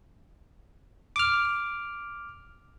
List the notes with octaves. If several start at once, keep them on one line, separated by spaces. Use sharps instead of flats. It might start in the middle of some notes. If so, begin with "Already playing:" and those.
D6 F6